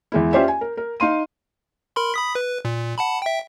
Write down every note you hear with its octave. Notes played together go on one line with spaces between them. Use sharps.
E2 G#3 E4
C#4 F4 G4 C5 D5 E5
G#5
A#4
A#4
D#4 F5 C6 D#7
A#4 B5 C6
B5 D#6 B6
B4
A#2
F#5 A5 B5
E5 G5